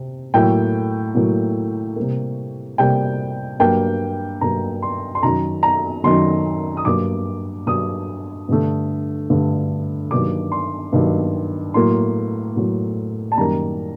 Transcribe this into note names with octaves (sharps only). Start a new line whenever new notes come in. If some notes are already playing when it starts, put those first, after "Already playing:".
Already playing: C3
A2 F#3 A#3 G5
A2 F#3 A#3
C3 G3 A#3
C3 G3 A#3 G5
G2 F#3 A#3 G5
G2 F#3 A#3 A#5
C6
C6
F#2 D#3 F#3 A#5
A#5
F#2 D#3 F#3 C6
D#6
G2 F#3 A#3 D6
G2 F#3 A#3 D#6
G2 D3 A3
G2 D3 A3
G2 D#3 F#3 A#3 D6
C6
G2 D#3 F#3 A#3
A2 F#3 A#3 C6
A2 F#3 A#3
A5
F#2 D#3 G3 A#3 A#5